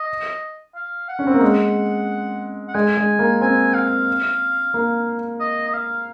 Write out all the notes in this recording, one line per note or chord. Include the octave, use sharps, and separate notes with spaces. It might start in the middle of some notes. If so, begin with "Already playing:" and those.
Already playing: D#5
F5
F#5
C#4
C4
A#3
G#3
F#5
G#3 G#5
G#3
A#3
C4 G#5
F5
A#3
D#5
D#5
F5